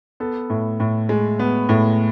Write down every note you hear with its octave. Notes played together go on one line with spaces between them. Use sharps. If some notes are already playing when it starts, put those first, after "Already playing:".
B3 A4
A2
A2
G#3
B3
A2